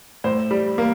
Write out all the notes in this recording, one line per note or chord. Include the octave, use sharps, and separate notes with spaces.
A2 C5
G3
A#3